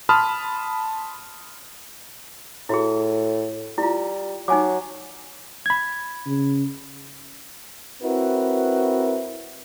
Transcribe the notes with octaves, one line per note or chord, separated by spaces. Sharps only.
A5 B5 C6 D#6 F6
A2 E4 F#4 G#4
G3 E4 F4
F#3 D#4 G#5 D6
B5 G#6
C#3
C4 E4 F#4 A#4 B4